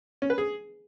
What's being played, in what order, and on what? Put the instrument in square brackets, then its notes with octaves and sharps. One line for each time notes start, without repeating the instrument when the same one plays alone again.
[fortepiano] C#4
B4
G#4